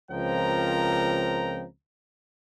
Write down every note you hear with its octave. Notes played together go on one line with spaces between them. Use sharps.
C#2 F3 C4 A#4 G5 A#5